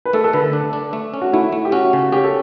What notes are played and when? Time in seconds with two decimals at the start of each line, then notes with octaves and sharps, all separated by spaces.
0.05 B4
0.13 A3 A4
0.24 A4
0.33 D3 B4
0.44 A4
0.53 D4
0.73 D4
0.93 A3
1.14 C#4
1.21 F#4
1.33 A3 E4
1.52 A3
1.65 G4
1.72 C#4 F#4
1.93 C#3
2.12 C#4 G4
2.24 A4